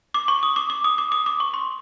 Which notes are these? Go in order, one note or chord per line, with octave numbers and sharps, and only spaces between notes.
D6
C#6
D#6
D6
D6
D#6
D6
D#6
D6
C#6
C6